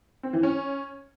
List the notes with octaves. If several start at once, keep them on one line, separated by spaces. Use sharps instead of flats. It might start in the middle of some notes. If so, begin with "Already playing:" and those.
C4
E3
C#4